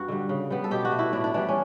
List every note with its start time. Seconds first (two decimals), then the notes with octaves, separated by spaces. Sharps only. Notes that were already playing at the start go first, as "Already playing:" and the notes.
Already playing: G2 F#4
0.08 D3 G3
0.29 C#3
0.50 G3 B3
0.64 A4
0.71 B2 G4
0.85 F#4
0.92 A3
0.99 E4
1.12 A2 D4
1.24 D4
1.34 E3 G3 D4
1.49 C#4